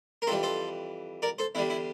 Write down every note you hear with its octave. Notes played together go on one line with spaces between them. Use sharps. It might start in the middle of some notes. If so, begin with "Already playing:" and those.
A#4
F2 E3 G3 A4 C5
A4 C5
A#4 D5
A4 C5
E2 D3 G3 E4
E4